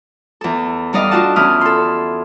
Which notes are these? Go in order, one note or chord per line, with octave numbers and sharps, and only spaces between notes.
E2 A4
G3 D#4 D5 D#5 F5
D4 F4 F#4 F#5 A5
E2 C#4 E4 D#6 F6
A4 C6